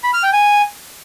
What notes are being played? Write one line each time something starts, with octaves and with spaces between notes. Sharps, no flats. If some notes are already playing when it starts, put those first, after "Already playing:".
B5
F6
G5
G#5